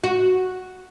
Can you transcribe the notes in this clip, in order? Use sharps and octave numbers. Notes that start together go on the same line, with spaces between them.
F#4